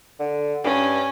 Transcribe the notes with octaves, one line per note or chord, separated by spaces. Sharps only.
D3
G2 C#4